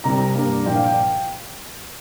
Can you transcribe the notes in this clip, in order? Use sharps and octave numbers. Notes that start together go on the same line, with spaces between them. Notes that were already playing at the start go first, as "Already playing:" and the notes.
C2 C3 G3 A#5
G2 G3 A#3
A#2 F3 A#3 G5
F5
G5